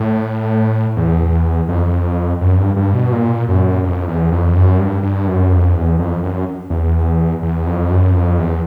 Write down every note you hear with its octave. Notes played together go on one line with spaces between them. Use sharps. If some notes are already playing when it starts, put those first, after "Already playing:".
Already playing: A2
E2
F2
F#2
G2
G2
B2
A#2
F#2
F2
E2
F2
F#2
G2
G2
F#2
F2
E2
F2
F#2
E2
E2
F2
F#2
F2
E2